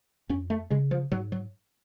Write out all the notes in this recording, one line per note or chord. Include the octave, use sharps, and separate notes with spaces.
F2 C#4
A3
C#3 G#3
F3
G#2 F#3
F#3